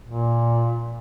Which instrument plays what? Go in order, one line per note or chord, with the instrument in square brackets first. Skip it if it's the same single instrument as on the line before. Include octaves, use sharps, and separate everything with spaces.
[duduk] A#2